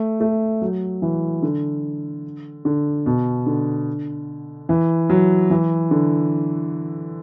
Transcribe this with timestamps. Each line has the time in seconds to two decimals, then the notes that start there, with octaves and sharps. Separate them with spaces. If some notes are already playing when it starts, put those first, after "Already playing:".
Already playing: A3
0.21 A3
0.62 F#3
1.02 E3
1.42 D3
2.65 D3
3.06 B2
3.46 D3
4.69 E3
5.09 F#3
5.50 E3
5.91 D3